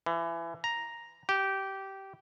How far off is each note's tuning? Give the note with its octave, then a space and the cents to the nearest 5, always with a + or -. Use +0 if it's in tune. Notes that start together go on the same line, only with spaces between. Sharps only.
E3 +25
A#5 +0
G4 -15